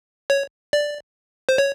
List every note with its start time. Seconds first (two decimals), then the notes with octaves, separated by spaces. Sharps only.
0.30 C#5
0.73 D5
1.49 C5
1.58 C#5